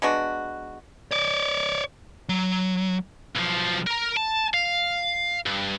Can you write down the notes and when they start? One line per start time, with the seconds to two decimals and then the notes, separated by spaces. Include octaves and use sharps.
0.02 G#3 B3 D4 F#4
1.11 C#5 D5
2.29 F#3
3.35 B1 F3
3.87 A#4 A#5
4.17 A5
4.54 F5
5.46 G2